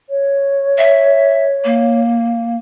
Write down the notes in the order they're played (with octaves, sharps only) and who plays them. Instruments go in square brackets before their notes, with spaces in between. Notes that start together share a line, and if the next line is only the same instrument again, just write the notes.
[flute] C#5
[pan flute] E5
A#3